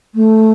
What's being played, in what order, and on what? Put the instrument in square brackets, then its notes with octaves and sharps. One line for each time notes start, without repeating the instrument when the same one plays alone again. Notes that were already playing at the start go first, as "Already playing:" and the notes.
[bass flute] A3